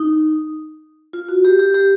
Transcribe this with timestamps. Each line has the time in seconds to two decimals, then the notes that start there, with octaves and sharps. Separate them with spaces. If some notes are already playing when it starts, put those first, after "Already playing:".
Already playing: D#4
1.13 F4
1.29 F#4
1.45 G4
1.59 G4
1.74 G4